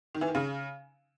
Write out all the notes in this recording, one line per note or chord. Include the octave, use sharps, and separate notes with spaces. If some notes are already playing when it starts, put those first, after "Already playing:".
D#3
E3
D#3
C#3